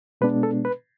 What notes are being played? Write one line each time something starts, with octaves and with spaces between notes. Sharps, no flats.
B2 G#3 B3 D4 B4
A4
B4